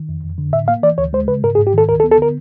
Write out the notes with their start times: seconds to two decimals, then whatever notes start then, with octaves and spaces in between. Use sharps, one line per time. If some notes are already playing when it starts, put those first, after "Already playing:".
Already playing: D#3
0.09 F2
0.23 F2
0.38 D3
0.53 A2 E5
0.68 A#3 F5
0.83 E3 D5
0.98 D2 C#5
1.13 G#3 C5
1.28 C#3 B4
1.43 G#2 A#4
1.55 G#4
1.58 G#2
1.67 G4
1.73 D#3 A4
1.89 D2 A#4
2.00 A4
2.04 B3
2.12 A4
2.18 D3 A#4